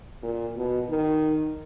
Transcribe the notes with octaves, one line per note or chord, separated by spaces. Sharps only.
A#2
B2
D#3